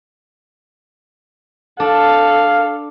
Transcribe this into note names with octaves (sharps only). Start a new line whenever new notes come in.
D4 A4 F5